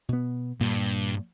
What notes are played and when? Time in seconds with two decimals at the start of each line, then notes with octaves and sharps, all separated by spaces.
0.09 B2 B3
0.60 G2 A#2